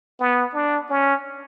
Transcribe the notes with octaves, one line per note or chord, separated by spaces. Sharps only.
B3
D4
C#4